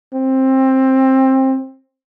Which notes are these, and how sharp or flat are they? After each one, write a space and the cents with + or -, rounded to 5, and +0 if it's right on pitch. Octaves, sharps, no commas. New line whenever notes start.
C4 +20